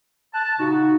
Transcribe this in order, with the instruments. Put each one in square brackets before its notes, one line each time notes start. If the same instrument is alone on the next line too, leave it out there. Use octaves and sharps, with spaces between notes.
[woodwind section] A5 [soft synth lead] F#6
[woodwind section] A#2 C#3 F#4 [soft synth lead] D#4